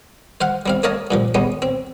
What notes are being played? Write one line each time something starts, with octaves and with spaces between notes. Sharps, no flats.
C5 F5 F#5
G3 C4 F5
A#3 C#5 D#5 F5 A5
G2 A#2 F3
G3 G#3 B3 C#4
C4